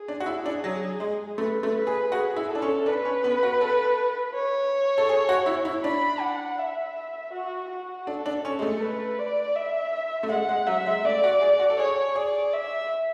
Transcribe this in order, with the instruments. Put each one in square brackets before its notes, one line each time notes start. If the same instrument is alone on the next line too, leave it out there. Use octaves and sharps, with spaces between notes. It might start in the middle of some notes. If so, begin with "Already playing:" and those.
Already playing: [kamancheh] G#4
[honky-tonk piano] D4
F#4
E4
D4
F#3
G#3
[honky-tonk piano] A3 [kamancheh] B4
[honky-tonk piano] A3
[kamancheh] B4
[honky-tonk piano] G#4
[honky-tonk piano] F#4 [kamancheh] G#4
[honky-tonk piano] E4
[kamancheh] A4
[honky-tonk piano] D4
C#4
[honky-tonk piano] D4 [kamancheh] B4
[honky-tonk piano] C#4
B3
F#4
A4
[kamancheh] C#5
[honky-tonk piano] A4
G#4
F#4
E4
E4
[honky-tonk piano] D4 [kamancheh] B5
[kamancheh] F#5
E5
F#4
F#4
[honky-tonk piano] D4 [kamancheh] A4
[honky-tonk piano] D4
[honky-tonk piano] C#4 [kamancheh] A4
[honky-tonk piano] G#3
A3
[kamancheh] B4
D5
E5
[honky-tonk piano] A3
[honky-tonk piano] G#3 [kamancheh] F#5
[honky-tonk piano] G#3
[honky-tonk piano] F#3 [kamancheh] E5
[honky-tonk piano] G#3
[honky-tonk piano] A3 [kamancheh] D5
[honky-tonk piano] F#4
G#4
F#4
A4
[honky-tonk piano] G#4 [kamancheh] C#5
[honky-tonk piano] G#4 [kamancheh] D5
[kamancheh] E5